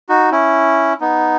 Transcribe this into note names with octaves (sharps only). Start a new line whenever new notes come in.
D#4 F#4
C#4 E4
B3 D#4